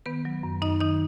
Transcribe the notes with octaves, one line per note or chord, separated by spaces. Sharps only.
D#3 B3 B4
F#3
F#2
F#2 D#4 D#5
D#3 D#4 D#5